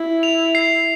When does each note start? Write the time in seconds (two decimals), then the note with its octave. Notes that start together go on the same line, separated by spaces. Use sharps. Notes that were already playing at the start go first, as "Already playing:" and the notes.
Already playing: E4
0.23 F7
0.55 C7